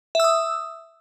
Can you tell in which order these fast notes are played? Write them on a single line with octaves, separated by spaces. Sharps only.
E5 E6 D#6